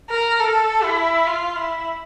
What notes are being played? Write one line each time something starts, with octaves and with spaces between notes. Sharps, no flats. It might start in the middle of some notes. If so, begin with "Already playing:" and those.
A#4
A4
E4
F4
E4